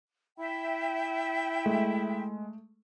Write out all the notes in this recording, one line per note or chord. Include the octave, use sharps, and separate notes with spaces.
E4 E5 G5
G#3 A3